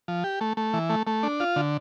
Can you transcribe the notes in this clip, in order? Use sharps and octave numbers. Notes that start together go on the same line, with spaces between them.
F3
G4
A3
A3
E3
A3
A3
D4
F4
D3